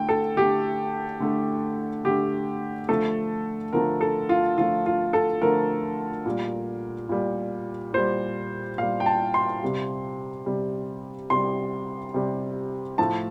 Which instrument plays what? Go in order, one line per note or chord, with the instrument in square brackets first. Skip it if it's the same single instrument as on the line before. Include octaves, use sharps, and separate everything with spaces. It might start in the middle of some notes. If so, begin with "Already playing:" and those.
Already playing: [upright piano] D3 A3 G5
A4
D3 A3 G4
D3 A3
D3 A3 G4
D3 F3 A3 A4
D3 F3 A3 A#4
A4
F4
D3 F3 A3 F4
F4
A4
D3 F3 A3 A#4
A#2 G3
A#2 G3
A#2 G3 C5
A#2 G3 F5
G5
A5
C6
C3 G3
C3 G3
C3 G3 C6
C3 G3
A2 F3 A3 A5